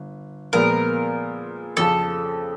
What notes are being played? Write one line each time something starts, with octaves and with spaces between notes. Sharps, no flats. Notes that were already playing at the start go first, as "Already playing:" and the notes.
Already playing: G1
A#2 F3 G#3 B3 A#4
F2 C#3 F3 A4